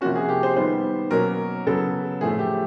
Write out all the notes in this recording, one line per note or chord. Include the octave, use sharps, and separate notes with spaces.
C3 F3 A#3 C#4 F#4
G#4
G4
C5
D#3 G3 B3 C5
B2 F#3 A#3 C#4 A#4
C#3 F#3 B3 A4
A2 F3 A3 G#4
G4